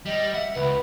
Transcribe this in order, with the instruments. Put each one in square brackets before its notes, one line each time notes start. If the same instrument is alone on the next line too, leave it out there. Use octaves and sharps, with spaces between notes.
[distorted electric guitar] G3 [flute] D#5
[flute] E5 [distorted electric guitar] F#5
[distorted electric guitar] C#2 [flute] B4